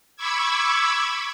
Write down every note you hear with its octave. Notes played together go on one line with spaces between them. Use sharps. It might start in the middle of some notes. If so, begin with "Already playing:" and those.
B5 C#6 D6 E6 G#6